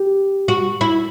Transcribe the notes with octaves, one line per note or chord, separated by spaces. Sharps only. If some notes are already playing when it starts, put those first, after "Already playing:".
Already playing: G4
F#4
E4